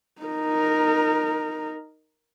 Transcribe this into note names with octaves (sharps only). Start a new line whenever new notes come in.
D#4 A#4